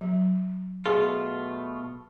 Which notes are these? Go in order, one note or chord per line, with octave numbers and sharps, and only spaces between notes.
F#3
B2 A3 F4 G#4